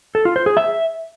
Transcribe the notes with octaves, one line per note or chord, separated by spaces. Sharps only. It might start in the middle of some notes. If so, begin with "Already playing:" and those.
A4
F4
C5
G#4
E5